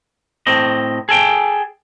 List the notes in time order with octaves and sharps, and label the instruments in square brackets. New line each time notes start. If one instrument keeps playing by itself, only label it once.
[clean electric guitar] A2 C4 D#5
G#4 A4 G5